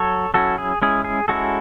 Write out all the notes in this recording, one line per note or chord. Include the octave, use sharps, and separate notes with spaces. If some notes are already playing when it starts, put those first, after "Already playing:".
Already playing: F#3 A4 C#5
F#3 C#4 E4 F#4 A4
G#4
G#3 C#4 E4 G#4
G#4
G#3 C#4 E4 F#4 A4